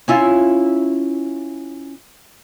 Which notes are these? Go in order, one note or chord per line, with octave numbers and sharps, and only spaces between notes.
C#4 E4 F4